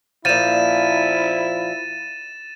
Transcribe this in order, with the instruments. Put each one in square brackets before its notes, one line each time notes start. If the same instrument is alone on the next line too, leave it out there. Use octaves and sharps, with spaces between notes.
[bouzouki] A#2 F3 [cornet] E4 [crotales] A6 D#7 E7